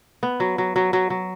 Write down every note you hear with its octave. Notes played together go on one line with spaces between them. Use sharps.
B3
F#3
F#3
F#3
F#3
F#3